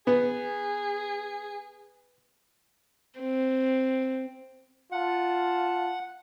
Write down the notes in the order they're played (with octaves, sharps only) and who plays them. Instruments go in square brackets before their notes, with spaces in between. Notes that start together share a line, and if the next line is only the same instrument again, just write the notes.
[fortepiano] B3 [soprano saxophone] G#4
[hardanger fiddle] C4
[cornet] F4 [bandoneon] F#5 [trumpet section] A5